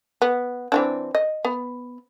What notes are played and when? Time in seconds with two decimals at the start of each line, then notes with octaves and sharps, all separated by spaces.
0.22 B3
0.72 E3 C4 D4
1.15 D#5
1.45 B3